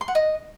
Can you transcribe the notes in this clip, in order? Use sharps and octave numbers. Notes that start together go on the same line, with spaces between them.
C6
F#5
D#5